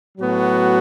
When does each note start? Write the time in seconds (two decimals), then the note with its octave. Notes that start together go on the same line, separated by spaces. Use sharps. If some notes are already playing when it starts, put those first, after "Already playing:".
0.18 A2 F#3 B3 F#4